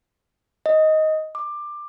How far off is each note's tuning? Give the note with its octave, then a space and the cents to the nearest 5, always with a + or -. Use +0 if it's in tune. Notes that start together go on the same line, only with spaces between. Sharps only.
D#5 +10
D6 +15